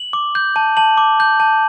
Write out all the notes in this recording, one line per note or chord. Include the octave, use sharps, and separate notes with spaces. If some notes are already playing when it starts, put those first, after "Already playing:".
Already playing: F#7
D6
G6
A5
A5 F#7
D6
G6
A5